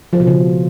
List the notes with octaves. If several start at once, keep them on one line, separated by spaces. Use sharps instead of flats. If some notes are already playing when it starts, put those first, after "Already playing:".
F3
B2
C#3